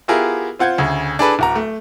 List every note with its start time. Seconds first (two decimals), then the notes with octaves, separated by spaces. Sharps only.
0.08 B3 E4 F4 G4 G#4 A#4
0.59 C4 F4 F#5 G6 G#6
0.78 D2 C#3
1.19 D4 G#4 A4 B4
1.39 D1 F#4 A#5
1.55 A3